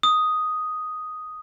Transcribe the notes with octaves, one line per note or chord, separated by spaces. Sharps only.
D#6